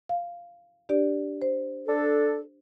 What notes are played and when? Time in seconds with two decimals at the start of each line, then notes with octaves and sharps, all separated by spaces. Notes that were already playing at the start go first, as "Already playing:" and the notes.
0.09 F5
0.89 D4 G4 D5
1.42 C5
1.86 D4 A4